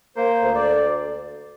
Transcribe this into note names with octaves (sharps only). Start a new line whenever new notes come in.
A#3 C5
D2
D5